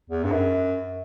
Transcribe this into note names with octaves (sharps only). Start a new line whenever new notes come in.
E2
G2
F#2